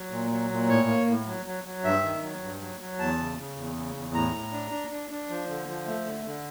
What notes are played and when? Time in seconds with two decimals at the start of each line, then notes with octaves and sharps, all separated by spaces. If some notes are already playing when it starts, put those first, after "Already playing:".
Already playing: F#3
0.11 A#2
0.30 F#3
0.50 A#2
0.68 A2 C#5
0.87 A#3
1.07 A2
1.26 F#3
1.46 F#3
1.64 F#3
1.84 G2 E5
2.03 D#3
2.22 F#3
2.42 G2
2.61 F#3
2.80 F#3
2.99 E2 A5
3.19 C#3
3.37 C#3
3.56 E2
3.75 C#3
3.94 E2
4.14 A2 A#5
4.33 A2
4.52 D4
4.71 D4
4.91 D4
5.11 D4
5.30 F3
5.49 D3
5.68 F3
5.86 A3
6.05 D3
6.26 D3